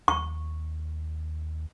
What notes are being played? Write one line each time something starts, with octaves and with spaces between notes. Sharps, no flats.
D#2 C#6